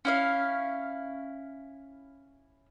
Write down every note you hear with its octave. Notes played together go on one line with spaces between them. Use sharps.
C#4 E4 F5